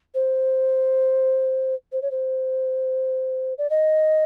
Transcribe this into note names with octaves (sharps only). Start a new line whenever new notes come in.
C5
C5
C#5
C5
D5
D#5